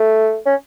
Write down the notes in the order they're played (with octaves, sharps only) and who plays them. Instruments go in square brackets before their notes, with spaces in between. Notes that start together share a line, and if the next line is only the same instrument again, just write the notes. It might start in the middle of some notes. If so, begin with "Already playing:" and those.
Already playing: [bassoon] A3
C#4